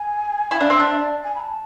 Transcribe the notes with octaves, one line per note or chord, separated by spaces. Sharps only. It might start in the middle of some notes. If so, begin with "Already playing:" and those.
Already playing: G#5
E4 G#5
D4 F5
C4 E5
D4
E5
D5
G#5
B5
A5